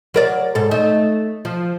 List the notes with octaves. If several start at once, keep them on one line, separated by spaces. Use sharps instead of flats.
F#3 A#4 D5
G#2 A4
A3 D#4
F3